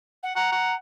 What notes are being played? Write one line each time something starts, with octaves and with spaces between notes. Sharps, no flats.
F#5
F#5 A#5
F#5